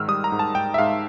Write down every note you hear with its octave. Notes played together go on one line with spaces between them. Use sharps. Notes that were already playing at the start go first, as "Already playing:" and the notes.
Already playing: G#2 D#3 E6 F6
G3 D#6
A#5
G#2
A5
G#2 G5
E5
G#2 F5